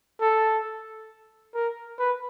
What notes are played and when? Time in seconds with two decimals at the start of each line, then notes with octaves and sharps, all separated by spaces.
0.21 A4
1.55 A#4
1.99 B4